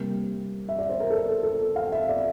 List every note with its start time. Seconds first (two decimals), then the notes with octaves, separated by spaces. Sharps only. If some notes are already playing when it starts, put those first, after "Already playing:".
Already playing: C3 G3 A#3
0.69 E5
0.79 D5
0.89 C5
1.00 A#4
1.10 A4
1.43 A4
1.76 F5
1.92 E5
2.09 D5